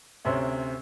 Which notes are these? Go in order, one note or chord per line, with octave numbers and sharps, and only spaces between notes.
D2 C3 C4 C#4